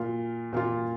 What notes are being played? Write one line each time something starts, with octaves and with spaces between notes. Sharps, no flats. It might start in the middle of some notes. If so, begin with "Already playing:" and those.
Already playing: A#2 A#3 F4
A#2 A#3 F4